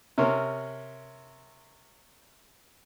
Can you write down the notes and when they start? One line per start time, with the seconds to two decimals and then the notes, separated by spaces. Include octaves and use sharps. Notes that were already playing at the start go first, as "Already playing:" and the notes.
0.18 C3 C#4 A#4